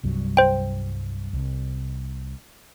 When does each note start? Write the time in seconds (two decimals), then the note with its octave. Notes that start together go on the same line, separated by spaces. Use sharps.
0.04 C2 G2 F#3
0.37 C5 G5
1.33 C2